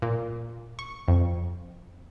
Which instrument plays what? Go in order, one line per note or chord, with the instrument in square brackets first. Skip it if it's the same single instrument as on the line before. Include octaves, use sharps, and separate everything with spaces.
[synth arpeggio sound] A#2
C#6
F2